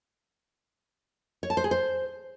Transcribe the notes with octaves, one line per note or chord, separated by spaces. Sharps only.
C#5
A5
C5
G#4
C5